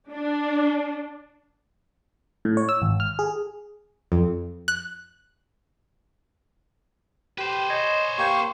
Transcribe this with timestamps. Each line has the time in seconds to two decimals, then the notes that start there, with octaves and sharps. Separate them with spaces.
0.11 D4
2.45 A2
2.57 C#5
2.69 E6
2.82 G#1
3.00 F6
3.19 G#4
4.12 F2
4.68 F#6
7.38 G4 B4 C5
7.69 C#5 D#5 G#5 G6
8.18 A#3 G4 C#6